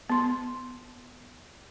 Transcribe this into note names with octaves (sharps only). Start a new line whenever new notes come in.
B3 C6